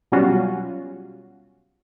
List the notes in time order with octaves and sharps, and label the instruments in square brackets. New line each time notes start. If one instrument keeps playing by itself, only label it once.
[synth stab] B2 F#3 G3 C#4 F4 F#4